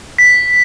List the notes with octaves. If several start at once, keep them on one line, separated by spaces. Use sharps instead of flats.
B6